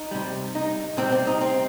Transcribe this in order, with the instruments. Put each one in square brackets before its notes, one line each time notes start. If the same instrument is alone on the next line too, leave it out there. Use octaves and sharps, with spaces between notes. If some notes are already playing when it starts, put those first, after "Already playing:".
Already playing: [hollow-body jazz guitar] D#4
C3 G3
D#4
C3 G3 C4
C4
D#4
C4